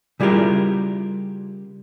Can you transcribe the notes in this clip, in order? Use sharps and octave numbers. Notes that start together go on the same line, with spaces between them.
C#3 G3 E4 F4 G4 A#4